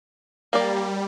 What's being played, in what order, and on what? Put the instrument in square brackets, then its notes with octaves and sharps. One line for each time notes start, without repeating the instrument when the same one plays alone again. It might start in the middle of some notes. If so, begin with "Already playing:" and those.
[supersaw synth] G3 [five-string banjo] A#3 D5